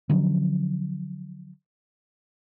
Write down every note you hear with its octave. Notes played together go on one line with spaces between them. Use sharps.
D3 F3 F#3 C#4